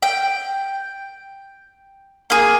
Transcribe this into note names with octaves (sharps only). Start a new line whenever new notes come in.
G5
A#3 G#4